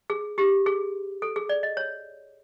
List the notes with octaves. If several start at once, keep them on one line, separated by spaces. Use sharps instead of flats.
G#4
G4
G#4
A4
G#4
D5
D#5
C#5